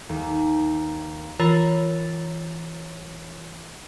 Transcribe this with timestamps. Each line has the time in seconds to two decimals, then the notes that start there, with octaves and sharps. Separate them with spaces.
0.09 D#2
1.40 E3 F4 A#4 C#5 A#5 A6